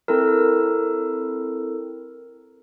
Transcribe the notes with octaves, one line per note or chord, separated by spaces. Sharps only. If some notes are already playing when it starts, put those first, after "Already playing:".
C4 E4 A4 A#4